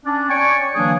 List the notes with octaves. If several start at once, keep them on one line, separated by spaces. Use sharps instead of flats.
C#4 D4
C#5 D5 G5 G#5 C#6
D3 E3 F#3 A#3 D4 G#4